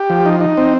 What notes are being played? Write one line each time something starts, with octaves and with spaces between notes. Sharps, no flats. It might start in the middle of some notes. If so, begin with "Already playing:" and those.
Already playing: G4
F3
D#4
D#4
C4